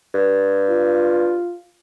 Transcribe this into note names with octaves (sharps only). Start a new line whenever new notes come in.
G2
F4